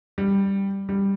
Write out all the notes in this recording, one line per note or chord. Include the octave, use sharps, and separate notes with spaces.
G3
G3